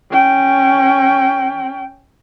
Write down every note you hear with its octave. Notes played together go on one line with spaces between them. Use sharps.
C#4 G5